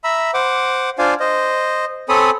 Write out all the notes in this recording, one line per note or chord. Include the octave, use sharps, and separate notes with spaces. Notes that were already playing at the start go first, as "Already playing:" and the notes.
E5 A#5 B5 E6
C5 F#5 D6
D4 F4 C5 D5 F5 G#5
C5 D#5
C4 A4 C#5 G#5 B5 D#6